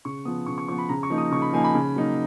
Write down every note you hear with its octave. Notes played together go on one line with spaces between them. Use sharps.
C#3 C#6
F3 B3 D#6
C#3 C#6
C#6
F3 B3 C#6
B5
C#3 A#5
C#6
F3 A#3 D#4
D#6
C#3 C#6
B5
F3 A#3 D#4 G#5
B5
C#3
F#3 A#3 D#4